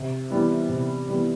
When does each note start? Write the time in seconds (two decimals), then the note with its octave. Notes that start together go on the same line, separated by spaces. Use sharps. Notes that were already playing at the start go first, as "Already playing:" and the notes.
Already playing: C3
0.30 E3 G3 B3 E4
0.69 C3
1.08 E3 G3 B3 E4